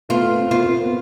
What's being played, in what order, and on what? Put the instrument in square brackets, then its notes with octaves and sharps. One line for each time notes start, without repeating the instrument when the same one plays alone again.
[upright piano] A3 B3 [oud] F4
[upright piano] C4
B3
[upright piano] A#3 C4 [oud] F4
[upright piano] A#3 C4
B3